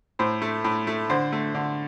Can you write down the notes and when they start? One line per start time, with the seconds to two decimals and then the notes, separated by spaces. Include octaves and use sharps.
0.19 A2 C5
0.42 A3
0.64 A2
0.87 A3
1.10 D3 C5
1.32 A3
1.55 D3